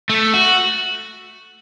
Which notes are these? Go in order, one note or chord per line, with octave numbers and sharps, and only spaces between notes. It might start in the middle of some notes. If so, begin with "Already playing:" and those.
A3
F#4